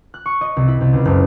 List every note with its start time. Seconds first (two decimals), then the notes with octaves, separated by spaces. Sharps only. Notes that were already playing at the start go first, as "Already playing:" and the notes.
0.14 F#6
0.26 C#6
0.41 D#5
0.57 C2
0.68 E4
0.81 C2
0.93 C#2
1.05 F#1